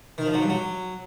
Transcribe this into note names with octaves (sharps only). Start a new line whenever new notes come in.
D#3
F3
F#3
G2
F#3